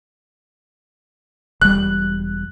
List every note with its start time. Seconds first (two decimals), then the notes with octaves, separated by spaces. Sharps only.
1.62 E1 G3 F#6